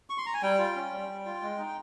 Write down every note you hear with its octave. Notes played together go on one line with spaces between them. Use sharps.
C#6
C6
A#5
G#5
G3 G5
F4
C#4
G3
G3
F4
G#3
D#4